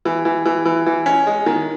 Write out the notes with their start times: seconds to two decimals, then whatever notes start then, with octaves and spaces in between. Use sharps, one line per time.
0.05 E3
0.25 E3
0.45 E3
0.65 E3
0.86 E3
1.06 C#4
1.27 G#3
1.46 D#3